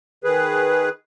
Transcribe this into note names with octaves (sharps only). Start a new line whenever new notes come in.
D#3 G#4 B4